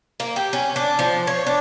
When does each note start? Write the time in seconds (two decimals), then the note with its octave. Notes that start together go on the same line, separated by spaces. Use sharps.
0.20 A#3
0.36 G4
0.53 C#4
0.76 D4
0.99 F3
1.27 C#5
1.46 D4